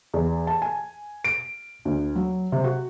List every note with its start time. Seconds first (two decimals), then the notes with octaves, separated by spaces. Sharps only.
0.14 E2
0.47 A5
0.62 G#5
1.24 D7
1.85 D2
2.16 F#3
2.52 C3
2.64 F#4